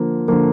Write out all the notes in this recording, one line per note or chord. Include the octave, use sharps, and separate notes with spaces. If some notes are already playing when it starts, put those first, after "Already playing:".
Already playing: D3 F3 A#3
D3 F3 A#3